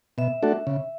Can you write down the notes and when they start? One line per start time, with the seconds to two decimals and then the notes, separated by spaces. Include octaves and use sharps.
0.18 B2 E5
0.43 A3 D4 F#4 A4
0.67 C#3